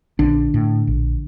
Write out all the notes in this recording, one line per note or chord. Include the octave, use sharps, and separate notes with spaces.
A#1 D3 D4
A2
A#1